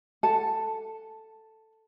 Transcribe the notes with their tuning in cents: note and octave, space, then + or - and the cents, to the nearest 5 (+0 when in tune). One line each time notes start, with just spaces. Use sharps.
A4 +5 F#5 +0 A5 -5